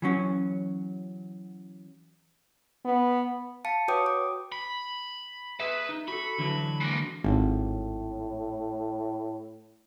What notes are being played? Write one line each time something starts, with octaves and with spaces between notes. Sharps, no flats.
E3 F#3 C#4
B3
F5 A5 C#7
F#4 B4 C#5 G5 D6 D#6
D6
B5
G#4 B4 E5
D#4
F#4 A4 B5
D3 E3 F#3
G#3 A#3
G#1 A2